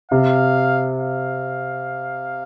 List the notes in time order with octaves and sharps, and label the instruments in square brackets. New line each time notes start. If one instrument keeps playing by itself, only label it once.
[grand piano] C3 [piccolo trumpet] F5
[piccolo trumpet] F5